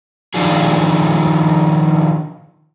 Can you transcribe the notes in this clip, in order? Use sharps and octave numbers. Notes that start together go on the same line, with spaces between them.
D#3 F3 D4 F4 G#4